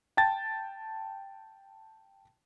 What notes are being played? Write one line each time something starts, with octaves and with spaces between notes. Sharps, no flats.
G5 A5 A6